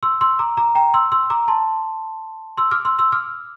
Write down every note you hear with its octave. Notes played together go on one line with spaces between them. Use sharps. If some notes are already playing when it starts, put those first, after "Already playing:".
C6 E6
C6 E6
A#5 D6
A#5 D6
G5 A#5
C6 E6
C6 E6
A#5 D6
A5 C6
C6 E6
D6 F6
C6 E6
C6 E6
D6 F6